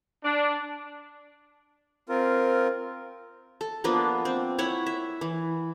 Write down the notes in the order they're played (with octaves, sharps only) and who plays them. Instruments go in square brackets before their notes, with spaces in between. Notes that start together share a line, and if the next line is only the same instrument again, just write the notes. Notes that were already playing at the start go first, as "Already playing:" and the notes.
[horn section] D4
[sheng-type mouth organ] C4 F4 A#4
[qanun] A4
F3 A#3 B3 D4
C4
E4 C#5 E5 F#5
E5
E3